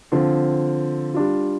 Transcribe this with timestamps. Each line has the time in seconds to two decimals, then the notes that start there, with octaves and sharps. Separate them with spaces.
0.12 D3 F3 C4 F4
1.14 G3 D4 F4